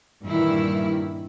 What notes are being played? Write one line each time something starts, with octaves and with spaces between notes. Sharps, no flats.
G2 A#2 D#3 E3 E4